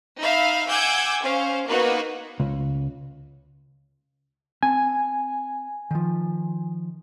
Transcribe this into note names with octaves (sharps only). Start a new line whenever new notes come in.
D#4 E5 F5 B5
F#5 G#5 D6 E6 G6 G#6
C#4 C5 F5
A#3 B3 D#4 F#4 B4
C#2
C4 G#5 A5
D#3 F3